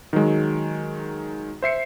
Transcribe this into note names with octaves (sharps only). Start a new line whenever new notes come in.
D#3 F#3 G#3
C5 E5 C7 C#7